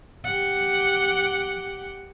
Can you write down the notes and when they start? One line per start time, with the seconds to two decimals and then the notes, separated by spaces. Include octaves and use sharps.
0.24 G4 F#5